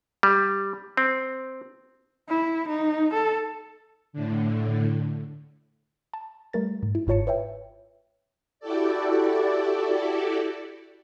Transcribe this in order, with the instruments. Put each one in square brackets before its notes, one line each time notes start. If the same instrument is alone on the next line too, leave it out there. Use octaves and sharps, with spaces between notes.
[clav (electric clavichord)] G3
C4
[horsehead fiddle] E4
D#4
A4
[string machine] A2 D3
[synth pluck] A5
G3 A3 A#4 A6
G#2
E4
G1 G#2 F4 C#5 A5 C#7
B4 C#5 E5 G5
[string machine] E4 F#4 G4 A4 D5